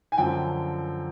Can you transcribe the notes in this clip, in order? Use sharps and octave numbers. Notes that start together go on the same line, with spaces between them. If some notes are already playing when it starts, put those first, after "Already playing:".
G#5
F#2 D3 F3 G5